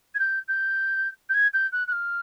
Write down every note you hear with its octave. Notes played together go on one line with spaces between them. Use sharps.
G#6
G6
G6
G6
G#6
G6
F#6
F#6
F6